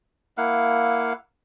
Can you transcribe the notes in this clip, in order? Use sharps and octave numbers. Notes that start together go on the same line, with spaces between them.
A#3 E4 F5 F#5